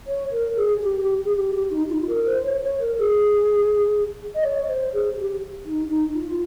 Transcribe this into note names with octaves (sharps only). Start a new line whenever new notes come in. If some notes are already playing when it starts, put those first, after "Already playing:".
C#5
A#4
G#4
G4
G4
G#4
G4
G4
D#4
F4
A#4
C5
C#5
C#5
A#4
G#4
D#5
C#5
C5
G#4
G4
D#4
D#4
F4